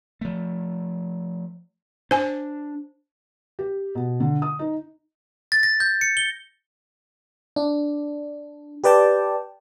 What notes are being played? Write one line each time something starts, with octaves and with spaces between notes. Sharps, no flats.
F3 A3
D4 C5 G#5
G4
B2
D3
D#6
D#4
A6
A#6
G6
C#7
G7
D4
G4 B4 D5 G5 A5